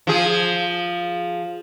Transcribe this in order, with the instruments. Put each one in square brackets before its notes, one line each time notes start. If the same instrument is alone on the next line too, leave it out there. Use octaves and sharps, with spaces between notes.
[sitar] F3 G#4